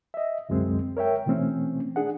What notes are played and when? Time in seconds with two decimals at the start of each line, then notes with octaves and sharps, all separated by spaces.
0.14 D#5 E5
0.49 C2 F#2 D3 G#3 C4
0.97 A#4 C#5 E5 G5
1.26 B2 E3 A3 C4 C#4
1.96 D4 G#4 F#5